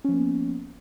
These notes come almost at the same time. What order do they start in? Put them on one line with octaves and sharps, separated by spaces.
C#4 F3 A#3 B3